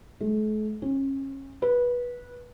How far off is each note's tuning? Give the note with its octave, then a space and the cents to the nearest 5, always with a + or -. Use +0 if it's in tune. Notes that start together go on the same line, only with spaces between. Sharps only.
A3 -45
C#4 -30
B4 -20